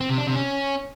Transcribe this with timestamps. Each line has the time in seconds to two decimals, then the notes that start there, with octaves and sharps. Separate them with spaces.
0.01 C4
0.09 C3
0.18 D4
0.27 C3
0.35 C#4